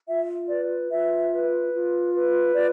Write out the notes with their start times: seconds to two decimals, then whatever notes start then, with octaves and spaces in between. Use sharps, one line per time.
0.08 F4 E5
0.49 B4 D5
0.90 F4 E5
1.31 B4
1.72 F4
2.13 B4
2.54 F4 D5